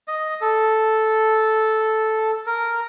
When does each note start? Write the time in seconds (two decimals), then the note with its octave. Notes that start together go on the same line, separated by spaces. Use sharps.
0.08 D#5
0.41 A4
2.46 A#4